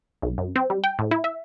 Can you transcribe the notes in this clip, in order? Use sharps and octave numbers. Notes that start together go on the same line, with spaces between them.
B1
F#2
C4
G3
G5
A2
E4
E5